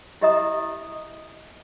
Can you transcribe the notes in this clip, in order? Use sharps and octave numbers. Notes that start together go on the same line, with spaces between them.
E4 G4 D#5 E5 A#5 D#6